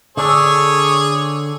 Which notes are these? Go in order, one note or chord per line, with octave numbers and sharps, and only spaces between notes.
D3 D4 G#4 A4 C#5